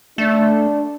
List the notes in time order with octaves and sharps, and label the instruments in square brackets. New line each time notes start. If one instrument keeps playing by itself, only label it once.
[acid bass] A3 [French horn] D4